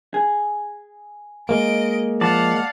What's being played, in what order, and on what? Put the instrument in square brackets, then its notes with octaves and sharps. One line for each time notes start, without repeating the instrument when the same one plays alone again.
[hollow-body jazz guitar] G#4
[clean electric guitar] G#3 A#3 [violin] D#5 D7
[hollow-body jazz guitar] F3 [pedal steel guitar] D5 A5 [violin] F5 F#5